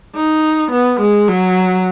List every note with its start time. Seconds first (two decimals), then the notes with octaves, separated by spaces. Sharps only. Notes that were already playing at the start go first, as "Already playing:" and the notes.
0.16 D#4
0.71 B3
1.00 G#3
1.29 F#3